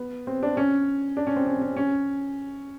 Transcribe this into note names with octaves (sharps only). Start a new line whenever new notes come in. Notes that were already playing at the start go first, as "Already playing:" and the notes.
Already playing: B3
C4
D4
C#4
D4
C#4
C4
C#4
C#4
C#4